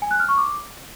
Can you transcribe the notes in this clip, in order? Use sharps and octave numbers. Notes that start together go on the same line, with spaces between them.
G#5
F#6
F6
C#6
D6